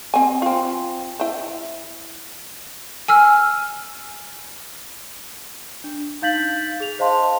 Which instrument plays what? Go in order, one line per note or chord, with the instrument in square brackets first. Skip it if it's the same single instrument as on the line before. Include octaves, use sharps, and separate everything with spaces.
[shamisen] C4 G#5
C4 F4
E4 C5
[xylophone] G#5 E6 F6
[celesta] D4
D#4 F5 G6 A6 B6 F#7
G#4 F7
C5 D#5 F5 A5 C6